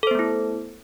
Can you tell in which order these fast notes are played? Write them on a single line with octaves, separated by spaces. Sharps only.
A4 C5 B3 A3 E4